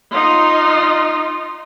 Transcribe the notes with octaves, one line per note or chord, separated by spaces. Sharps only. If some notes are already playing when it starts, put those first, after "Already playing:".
D#4 F4